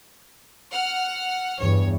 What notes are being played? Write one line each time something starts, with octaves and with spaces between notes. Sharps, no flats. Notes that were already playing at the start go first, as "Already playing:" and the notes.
F#5 F6
E2 G2 C#5